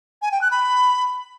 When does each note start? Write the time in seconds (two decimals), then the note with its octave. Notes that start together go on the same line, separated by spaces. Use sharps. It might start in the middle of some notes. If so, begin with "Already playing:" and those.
0.22 G#5
0.32 G5
0.41 F#6
0.51 B5